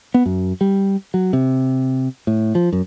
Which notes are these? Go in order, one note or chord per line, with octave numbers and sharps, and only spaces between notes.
B3
F#2
G3
F#3
C3
A2
F3
F#2